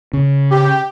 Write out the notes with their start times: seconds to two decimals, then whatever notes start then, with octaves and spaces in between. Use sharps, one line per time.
0.13 C#3
0.51 G4